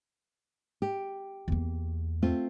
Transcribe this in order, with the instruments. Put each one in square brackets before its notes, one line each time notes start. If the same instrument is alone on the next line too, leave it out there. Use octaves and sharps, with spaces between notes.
[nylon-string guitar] G4
[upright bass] E2 A#3
[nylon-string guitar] A3 C4 F4